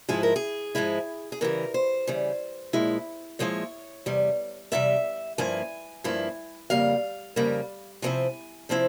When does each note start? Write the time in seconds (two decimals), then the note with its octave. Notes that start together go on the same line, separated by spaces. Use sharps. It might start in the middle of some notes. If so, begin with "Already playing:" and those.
0.09 G#2 F3 G#3 E4 G#4
0.23 A#4
0.36 G#4
0.75 G#2 F3 G#3 E4
1.32 G#4
1.41 C#3 E3 G3 A#4
1.74 C5
2.07 C#3 E3 G3
2.73 A#2 F3 G#3 E4
3.39 A#2 F3 G#3 E4 C#5
4.06 E2 C3 G3
4.72 E2 C3 G3 E5
5.38 G2 F3 A#3 E4 G#5
6.04 G2 F3 A#3 E4
6.70 F2 C#3 G3 A#3 F5
7.36 F2 C#3 G3 A#3
8.02 C3 F3 C4 E4 G#5
8.69 C3 F3 C4 E4